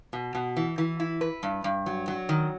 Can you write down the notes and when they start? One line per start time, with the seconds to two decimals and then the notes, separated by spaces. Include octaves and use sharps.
0.13 B2
0.35 B2
0.57 E3
0.78 E3
1.00 E4
1.21 B4
1.43 G2
1.64 G2
1.86 F#3
2.08 F#3
2.29 D#3